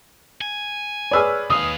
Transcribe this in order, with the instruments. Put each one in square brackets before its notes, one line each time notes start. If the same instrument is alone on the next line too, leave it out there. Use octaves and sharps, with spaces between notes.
[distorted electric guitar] G#5
[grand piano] G#4 B4 C#5 [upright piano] D5 E6 F6
[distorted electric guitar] D#2 F5 [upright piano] D#6